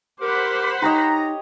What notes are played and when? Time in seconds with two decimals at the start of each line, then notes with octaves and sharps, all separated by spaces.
0.20 G4 A#4 C5 F#5 B5 D6
0.82 D#4 G4 C#5 D#5 A#5